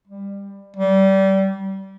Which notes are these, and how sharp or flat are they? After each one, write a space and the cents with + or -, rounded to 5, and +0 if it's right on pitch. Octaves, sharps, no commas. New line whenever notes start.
G3 +20
G3 -25